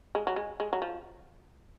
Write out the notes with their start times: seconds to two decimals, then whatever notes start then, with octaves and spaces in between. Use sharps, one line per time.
0.15 G#3
0.27 F#3
0.36 G#3
0.60 G#3
0.73 F#3
0.82 F3